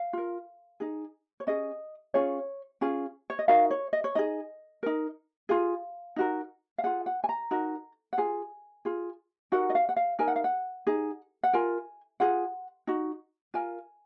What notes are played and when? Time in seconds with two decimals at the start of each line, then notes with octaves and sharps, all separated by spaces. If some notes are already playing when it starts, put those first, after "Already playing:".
Already playing: F5
0.13 F4 A#4
0.80 D#4 G#4
1.40 C#5
1.47 C#4 G#4 D#5
2.14 C#4 F4 G#4 C#5
2.81 C#4 F4 G#4
3.30 C#5
3.39 D#5
3.48 D#4 F#4 A#4 F5
3.71 C#5
3.93 D#5
4.04 C#5
4.15 D#4 G#4 D#5
4.83 D#4 A#4
5.49 F4 G#4 F5
6.16 D#4 F#4 A#4
6.78 F5
6.84 F4 G#4 F#5
7.06 F#5
7.24 G#5
7.29 A#5
7.51 D#4 F#4 A#4
8.13 F#5
8.18 F4 G#4 G#5
8.85 F4 G#4
9.52 D#4 F#4 A#4 F#5
9.70 D#5
9.75 F5
9.89 F#5
9.96 F5
10.19 D#4 A#4 G#5
10.28 F#5
10.36 F5
10.44 F#5
10.87 D#4 G#4
11.43 F#5
11.53 F4 A#4 G#5
12.20 F4 G#4 F#5
12.87 D#4 F#4
13.54 F4 A#4 G#5